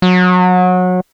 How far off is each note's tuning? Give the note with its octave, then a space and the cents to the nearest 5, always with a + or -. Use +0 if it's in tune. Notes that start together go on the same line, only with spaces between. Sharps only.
F#3 -25